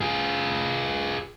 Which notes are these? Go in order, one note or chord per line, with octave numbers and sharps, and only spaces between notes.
F4 G#4